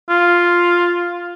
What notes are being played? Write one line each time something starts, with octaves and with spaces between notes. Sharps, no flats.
F4